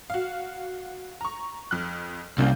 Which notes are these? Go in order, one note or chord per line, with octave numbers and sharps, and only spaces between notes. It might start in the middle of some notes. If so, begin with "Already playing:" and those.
F#4 F5
A#5 C#6
F2 F6 F#6
C2 C#3 A#3 G6